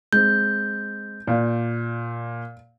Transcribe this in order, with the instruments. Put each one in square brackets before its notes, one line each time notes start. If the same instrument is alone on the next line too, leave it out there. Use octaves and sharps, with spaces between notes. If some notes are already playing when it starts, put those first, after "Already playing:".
[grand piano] G#3 C4 [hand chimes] G6
[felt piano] A#2 [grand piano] D5 F5